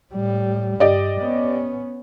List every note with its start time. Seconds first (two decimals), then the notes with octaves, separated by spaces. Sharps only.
0.13 A2 G3
0.80 G2 G4 D5 D#5
1.20 B3 C#4